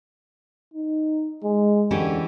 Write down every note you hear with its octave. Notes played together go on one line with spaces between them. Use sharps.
D#4
G#3
D3 E3 C#4 G4